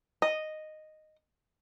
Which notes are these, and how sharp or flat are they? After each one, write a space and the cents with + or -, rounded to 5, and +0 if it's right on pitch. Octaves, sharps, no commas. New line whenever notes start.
D#5 -5